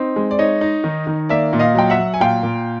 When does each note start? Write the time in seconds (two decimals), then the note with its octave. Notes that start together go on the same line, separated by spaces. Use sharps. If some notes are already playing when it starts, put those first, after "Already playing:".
Already playing: C4 D#4
0.16 G#3
0.31 D5
0.39 D#4 C#5 D#5
0.61 D#4
0.84 D#3
1.07 D#3
1.29 A#3 D5 E5
1.53 A#2
1.59 D#5 F5
1.75 F#3 G5
1.90 E5 F#5
1.97 F#3
2.14 G#5
2.20 A#2 F5 G5
2.43 A#2